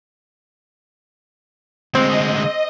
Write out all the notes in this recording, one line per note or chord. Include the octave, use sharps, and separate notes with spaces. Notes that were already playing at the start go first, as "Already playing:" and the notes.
D2 G#3 C4 D#5